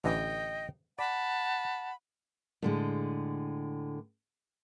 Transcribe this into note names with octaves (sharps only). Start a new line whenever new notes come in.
A1 D3 E3 D#5 G5
D5 F#5 A5 B5
A2 D3 G#3